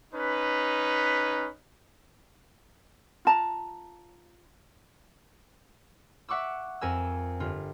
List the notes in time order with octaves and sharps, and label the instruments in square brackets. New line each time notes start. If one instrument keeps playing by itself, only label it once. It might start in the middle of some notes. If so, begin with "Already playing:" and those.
[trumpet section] C#4 D#4 B4
[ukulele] F4 A5 A#5
[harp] E5 F#5 C#6 D6 E6
F2 A#4 G#5 E6
G1 F4